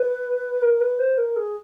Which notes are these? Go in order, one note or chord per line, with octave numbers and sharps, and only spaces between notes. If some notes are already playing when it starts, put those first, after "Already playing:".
Already playing: B4
A#4
B4
C5
A#4
G#4